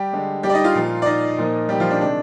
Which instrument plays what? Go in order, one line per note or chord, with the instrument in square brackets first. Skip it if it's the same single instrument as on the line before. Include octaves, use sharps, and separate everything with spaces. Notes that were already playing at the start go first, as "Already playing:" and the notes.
Already playing: [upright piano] G3 G4
D3 G#3
G3 G4
D5
D#4 D#5
F4 F5
A#2 F3 A#3
D5
D#4 D#5
A#2 F3 A#3
G3 G4
F3 F4
D4
C3 D#3 G#3 D4